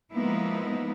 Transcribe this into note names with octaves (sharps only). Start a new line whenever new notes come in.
F3 G#3 A#3 B3 D#4 E4